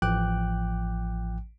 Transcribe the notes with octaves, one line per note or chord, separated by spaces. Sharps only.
A1 F3 G5 D6 F#6